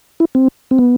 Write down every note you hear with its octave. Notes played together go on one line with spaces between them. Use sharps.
E4
C4
C4
B3